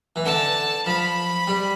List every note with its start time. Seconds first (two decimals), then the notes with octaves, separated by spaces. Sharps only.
0.16 E3
0.25 D3 A5
0.86 F3 B5
1.47 G3